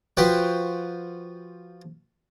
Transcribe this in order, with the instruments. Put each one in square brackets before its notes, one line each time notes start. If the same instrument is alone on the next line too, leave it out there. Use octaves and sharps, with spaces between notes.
[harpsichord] F3 F#4 B4 C5 G5